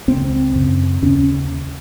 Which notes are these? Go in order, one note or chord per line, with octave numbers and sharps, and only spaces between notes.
C#2 C#3 C4
F#2 C#3
D#2 C#3 C#4